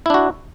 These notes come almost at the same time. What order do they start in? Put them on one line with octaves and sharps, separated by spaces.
E4 D4 F#4